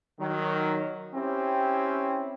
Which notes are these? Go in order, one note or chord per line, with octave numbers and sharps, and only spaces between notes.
D#3 F#3
C4 C#4 E4 G4